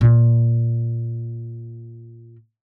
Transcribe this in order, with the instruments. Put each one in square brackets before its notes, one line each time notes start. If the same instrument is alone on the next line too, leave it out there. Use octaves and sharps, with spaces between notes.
[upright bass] A#2 A#3